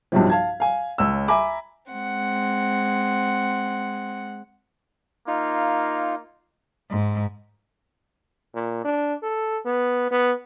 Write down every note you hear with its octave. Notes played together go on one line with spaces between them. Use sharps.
B1 G2 C3 F3
F5 A5 G#6
F5 G#5
C#2 E6
E5 G#5 A#5 B5 D6
G#3 C4 F#5
A#3 D#4 F4
G#2
A#2
D4
A4
B3
B3